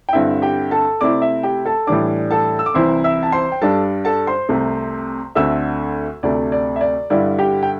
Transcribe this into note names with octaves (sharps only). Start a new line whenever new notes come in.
G5
G2 D3 C4 E4 E5
G4 G5
A4 A5
C3 A3 C4 E4 D5 D6
E5
G4 G5
A4 A5
A2 E3 G3 D4 D5 D6
A4 A5
E6
D6
C2 C3 E3 C4 E4 C5 C6
E5 E6
A5
C5 C6
G5
G2 G3 D4 A4 A5
A4 A5
C5 C6
C2 C3 A3
D2 D3 A3 C4 E5 E6
D2 C3 A3 D5
D5
E5
D5
G2 D3 G3 E4 D5
G4 G5
G5